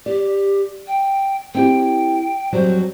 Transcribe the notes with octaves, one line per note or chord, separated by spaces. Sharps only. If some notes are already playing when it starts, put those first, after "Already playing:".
G4 D5
G5
C4 E4 G4 G5
F2 F#3 G3 C5